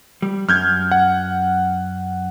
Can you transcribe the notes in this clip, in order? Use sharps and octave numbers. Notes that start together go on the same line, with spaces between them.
G3
F#2 F6 G6 G#6
F#5